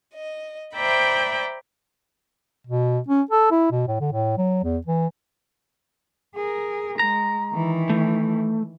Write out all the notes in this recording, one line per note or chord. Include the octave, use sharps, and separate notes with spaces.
D#5
C5 D5 E5 G5 A#5 B5
B2
C#4
A4
E4
B2
A2
D3
A2
F#3
E2
E3
G#4 A#4
G#3 A#5
D#3 E3
A3